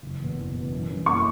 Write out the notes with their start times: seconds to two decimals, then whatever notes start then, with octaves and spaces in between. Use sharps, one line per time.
0.03 F#1
0.19 E2 B2
0.37 F#1
0.54 E2 B2
0.72 F#2
0.90 E3 G3 C#4
1.06 F#2 C#6